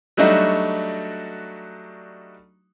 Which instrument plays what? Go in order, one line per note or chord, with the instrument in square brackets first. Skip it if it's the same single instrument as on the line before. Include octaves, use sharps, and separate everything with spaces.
[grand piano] F#3 G3 A3 D4 D#4 F#4